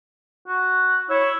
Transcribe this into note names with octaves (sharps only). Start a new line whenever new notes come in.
F#4
E4 C#5